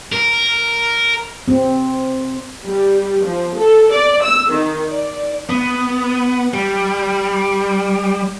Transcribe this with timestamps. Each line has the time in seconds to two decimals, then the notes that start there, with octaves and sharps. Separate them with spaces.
0.12 A#4
1.48 C4
2.65 G3
3.25 F3
3.57 A4
3.92 D5
4.23 E6
4.52 D#3
4.89 D5
5.49 B3
6.54 G3